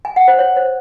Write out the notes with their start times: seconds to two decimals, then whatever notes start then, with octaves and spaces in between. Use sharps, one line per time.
0.05 G#5
0.16 F#5
0.28 C5
0.39 C#5
0.56 C5